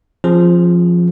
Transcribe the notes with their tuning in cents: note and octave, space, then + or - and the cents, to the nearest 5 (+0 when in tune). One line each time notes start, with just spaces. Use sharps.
F3 +0 C4 +35 G#4 +0